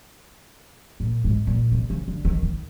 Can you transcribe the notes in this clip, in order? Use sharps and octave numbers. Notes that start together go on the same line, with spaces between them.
A#2
G#2
A#2
C3
C#3
D3
D#3
D#3